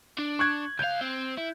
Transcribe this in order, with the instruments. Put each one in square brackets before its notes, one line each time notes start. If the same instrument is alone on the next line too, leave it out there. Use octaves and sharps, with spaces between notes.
[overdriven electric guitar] D4
[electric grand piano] C#6 F#6 G#6
[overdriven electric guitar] C#2 F5 [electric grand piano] G6
[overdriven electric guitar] C4
E4